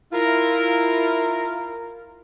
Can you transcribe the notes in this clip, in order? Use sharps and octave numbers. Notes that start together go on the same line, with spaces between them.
E4 F4 A#4